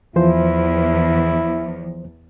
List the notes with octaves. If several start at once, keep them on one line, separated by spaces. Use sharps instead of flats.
E2 E3 F3 E4 C5